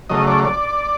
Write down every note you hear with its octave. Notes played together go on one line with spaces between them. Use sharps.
C#3 F#3 A3 D#5
D5
D5